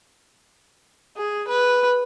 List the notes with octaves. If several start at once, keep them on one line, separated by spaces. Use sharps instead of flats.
G#4
B4